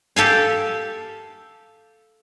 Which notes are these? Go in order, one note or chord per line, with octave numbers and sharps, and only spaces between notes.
G4 A4 F5 G#5